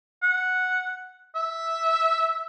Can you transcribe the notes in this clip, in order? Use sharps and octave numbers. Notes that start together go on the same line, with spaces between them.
F#5
E5